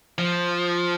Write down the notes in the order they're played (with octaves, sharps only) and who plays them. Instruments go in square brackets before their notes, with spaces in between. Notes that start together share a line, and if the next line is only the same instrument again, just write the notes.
[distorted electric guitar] F3